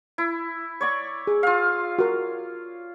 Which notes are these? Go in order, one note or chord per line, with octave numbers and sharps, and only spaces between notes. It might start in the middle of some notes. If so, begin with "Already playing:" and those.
E4
C#5 D5 C#6
G#4
F4 F5
F#4 A#4